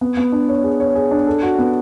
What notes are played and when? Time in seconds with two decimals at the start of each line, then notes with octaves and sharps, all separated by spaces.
0.01 B3
0.17 B3
0.32 D4
0.49 C#5
0.64 G#4
0.80 C#5
0.95 G#4
1.11 D4
1.27 A4
1.43 F#4
1.59 B3